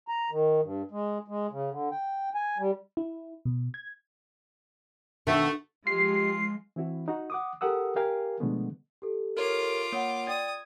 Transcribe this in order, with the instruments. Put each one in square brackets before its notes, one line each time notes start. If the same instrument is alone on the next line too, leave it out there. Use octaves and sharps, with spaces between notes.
[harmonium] A#5
D#3
G2
G#3
G#3
C#3
D3
G5
G#5
G3
[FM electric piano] E4
B2
G#6
[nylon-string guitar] B2 D3 D#3 [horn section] A3
[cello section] F3 G#3 [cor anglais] F4 [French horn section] G4 [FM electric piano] C7
[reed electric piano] E3 C4 E4 F#4
D#4 F#4
F#5 D6 D#6
G4 A4 A#4 F#5 D#6 E6
G4 A#4 F5 G5 G#5
B2 D3 F3 G#3 A3 B3
[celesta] G4 A4
[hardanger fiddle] F4 D6 [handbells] A#4 C#5
[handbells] A#3 [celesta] C#5 F#5
[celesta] D5 G5 A6 [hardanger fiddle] D#6 [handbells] G#6